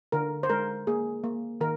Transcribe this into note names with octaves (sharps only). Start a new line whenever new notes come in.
D3 A#4
C5
G#3 A#4
A#3 G#4
A#3
D#3 A#4